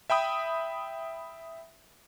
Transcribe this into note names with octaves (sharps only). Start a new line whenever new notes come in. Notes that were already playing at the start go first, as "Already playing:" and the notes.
E5 G5 B5 D#6